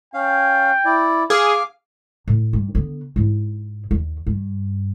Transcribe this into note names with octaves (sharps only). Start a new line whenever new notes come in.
C#4 F5 G5
E4 D5
G#4 F5 D6 F6
A2
G2
D3 B3
G#2 E4
D#2
G2